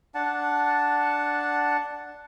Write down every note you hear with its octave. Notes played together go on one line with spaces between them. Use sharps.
D4 F#5 A5